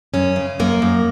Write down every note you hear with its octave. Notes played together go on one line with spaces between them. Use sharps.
F#2 C#4
C#3
F#2 A#3
F#2